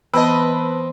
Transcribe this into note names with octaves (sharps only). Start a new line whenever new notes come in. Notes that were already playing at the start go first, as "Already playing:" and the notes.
E3 B3 C4 B4 D#5 A5 E6